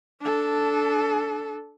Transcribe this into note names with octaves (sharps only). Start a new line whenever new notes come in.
D4 A4